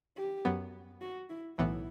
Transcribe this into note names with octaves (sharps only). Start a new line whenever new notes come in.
G4
F#2 F#3 B3
F#4
E4
B1 A2 E3 B3 E4